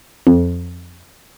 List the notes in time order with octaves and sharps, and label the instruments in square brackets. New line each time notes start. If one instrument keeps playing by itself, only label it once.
[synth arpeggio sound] F2